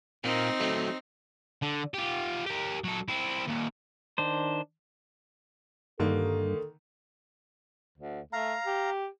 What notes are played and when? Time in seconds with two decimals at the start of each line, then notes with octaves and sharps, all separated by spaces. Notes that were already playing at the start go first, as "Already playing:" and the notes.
0.24 A#2 A#3 C4 D#4
0.60 F#3 A3
1.62 D3
1.94 F4 G4
2.46 G4 A#4
2.84 F#3 A4
3.08 C4 E4
3.47 D#2 A#2
4.18 D#3 D4 C5
6.00 G2 D3 D#3 A#3 A4
7.98 D2
8.33 A3 F5 A#5
8.66 G4